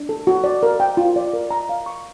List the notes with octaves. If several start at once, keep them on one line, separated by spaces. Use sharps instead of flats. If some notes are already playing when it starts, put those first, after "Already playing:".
Already playing: D4
A4
F#4
D5
A#4
G5
F4
D5
A#4
A#5
F5
C#6